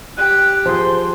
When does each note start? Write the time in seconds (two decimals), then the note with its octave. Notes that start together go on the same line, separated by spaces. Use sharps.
0.17 G4 F#6
0.66 F3 G#4 C5 C6